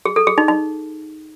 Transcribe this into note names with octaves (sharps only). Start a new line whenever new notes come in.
G#4
A4
G#4
D#4
D#4